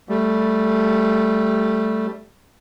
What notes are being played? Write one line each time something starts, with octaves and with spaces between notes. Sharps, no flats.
G3 A3